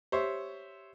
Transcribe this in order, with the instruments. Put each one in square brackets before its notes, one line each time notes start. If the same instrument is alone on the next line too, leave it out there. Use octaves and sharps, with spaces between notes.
[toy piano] G4 [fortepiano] C5 C#5 E5